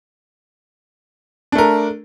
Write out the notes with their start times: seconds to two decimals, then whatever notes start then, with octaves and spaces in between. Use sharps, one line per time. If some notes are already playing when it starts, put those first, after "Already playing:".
1.52 D4
1.55 A3
1.58 A#4